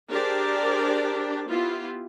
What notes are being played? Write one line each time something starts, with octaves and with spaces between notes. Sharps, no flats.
D4 G4 G#4 A#4 C5 D5
B3 E4 F4 G4